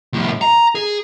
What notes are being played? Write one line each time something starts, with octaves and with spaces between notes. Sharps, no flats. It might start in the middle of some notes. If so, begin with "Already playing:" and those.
C2 A2
A#5
G#4